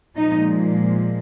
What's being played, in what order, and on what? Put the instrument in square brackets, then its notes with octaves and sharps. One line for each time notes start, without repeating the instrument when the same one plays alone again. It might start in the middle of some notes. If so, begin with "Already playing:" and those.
[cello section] A#2 F3 G#3 D#4